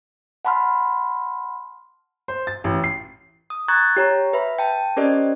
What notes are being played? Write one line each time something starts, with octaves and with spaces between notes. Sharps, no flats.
F#5 A5 B5 C6 F6
C5
A6
A1
C7
D#6
A#5 C#6 F#6 G#6 A6
G4 C#5 A#5
B4 E5 B5
G5 A5
C#4 G4 A#4 C5 D5 D#5